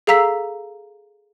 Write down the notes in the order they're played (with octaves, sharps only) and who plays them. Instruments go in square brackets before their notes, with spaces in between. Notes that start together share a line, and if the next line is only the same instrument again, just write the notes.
[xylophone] G#4 A4 F5 A#5 E6 B6